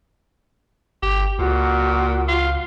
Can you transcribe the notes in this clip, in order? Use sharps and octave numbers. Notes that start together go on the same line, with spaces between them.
G1 G4
C#2 A#2 F#4
F4